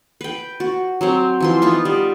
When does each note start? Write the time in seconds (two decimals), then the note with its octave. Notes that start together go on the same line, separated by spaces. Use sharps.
0.21 B4 G5
0.60 F#4
1.01 F#3 C4 C5
1.40 E3 F3 C6
1.62 B3 D#4 F4
1.85 G3